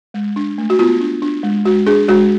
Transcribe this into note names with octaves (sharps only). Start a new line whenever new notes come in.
G#3
D4
A3
F#4
B3 F4
D4
D4
G#3
G#3 F#4
D4 G#4
G#3 F#4